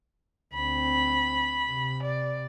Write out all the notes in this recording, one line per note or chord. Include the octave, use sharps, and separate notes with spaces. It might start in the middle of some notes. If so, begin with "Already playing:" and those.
D2 C4 B5
C3
D5